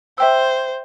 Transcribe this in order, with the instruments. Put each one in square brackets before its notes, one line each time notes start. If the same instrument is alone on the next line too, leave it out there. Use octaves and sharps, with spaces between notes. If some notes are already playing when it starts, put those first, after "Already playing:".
[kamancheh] C5 [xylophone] E5 G5 E6